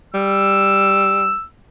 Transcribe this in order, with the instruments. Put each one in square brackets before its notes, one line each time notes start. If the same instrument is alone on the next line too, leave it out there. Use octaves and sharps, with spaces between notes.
[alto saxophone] G3 [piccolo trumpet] E6